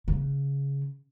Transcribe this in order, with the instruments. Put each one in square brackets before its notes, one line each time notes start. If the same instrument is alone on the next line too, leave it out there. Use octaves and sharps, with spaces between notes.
[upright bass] C#3